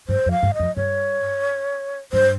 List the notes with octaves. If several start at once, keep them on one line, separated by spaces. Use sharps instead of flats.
G2 C5
F2
F5
G2
D#5
F2
G2 C#5
G2 C5